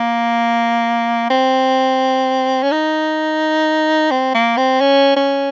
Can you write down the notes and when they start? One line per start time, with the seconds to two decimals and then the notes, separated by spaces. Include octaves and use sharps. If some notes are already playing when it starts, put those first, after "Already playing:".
Already playing: A#3
1.30 C4
2.63 C#4
2.71 D#4
4.11 C4
4.35 A#3
4.57 C4
4.81 C#4
5.16 C#4